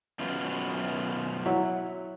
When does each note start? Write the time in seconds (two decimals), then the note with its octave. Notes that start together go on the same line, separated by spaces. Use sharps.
0.20 F#2 B2 F4
1.46 F#3 E4